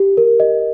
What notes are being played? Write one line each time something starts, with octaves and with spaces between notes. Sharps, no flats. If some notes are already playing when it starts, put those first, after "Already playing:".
Already playing: G4
A#4
D#5